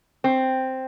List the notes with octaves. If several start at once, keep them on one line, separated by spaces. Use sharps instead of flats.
C4